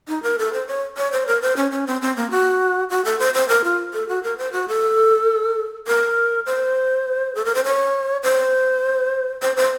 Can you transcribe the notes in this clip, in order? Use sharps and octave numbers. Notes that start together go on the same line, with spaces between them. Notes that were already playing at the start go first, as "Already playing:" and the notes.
D#4
A#4
A4
C5
C#5
C#5
C5
A#4
C5
C#4
C#4
C4
C4
A#3
F#4
F#4
A4
C5
C5
A#4
F4
A4
F#4
A#4
C5
F#4
A4
A#4
C5
A4
A#4
C5
C#5
C5
C5
C5